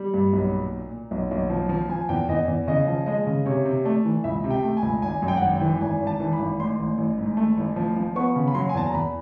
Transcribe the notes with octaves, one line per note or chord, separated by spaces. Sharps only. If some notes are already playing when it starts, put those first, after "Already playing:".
Already playing: G3
G2
B1
A#2
A#2
A#2
B1
B1
F3
F3
F3 G#5
E2 G5
E2 D#5
E2
C#3 D#5
F3
G#3 D#5
C#3
C3 C#5
C3
A3 D5
E3
C#2 E5
C3
G5
A3
G#5
C#2
G#1 G#5
F#2
G5
F#5
G#1 G5
G5
E3
G#1 G#5
G#1
A5
E3
B5
G#1
A1 C6
A1
A1
G#2
A3
A1
F3
F3
B3 C#6
C#3
B5
F#3 C6
G#5
E2 A5
A#5
E2 B5